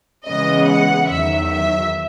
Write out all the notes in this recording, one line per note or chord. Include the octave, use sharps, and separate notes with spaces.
C#3 E3 G#3 B3 D#5
F#5
E2 D#3 F#3 E5
E5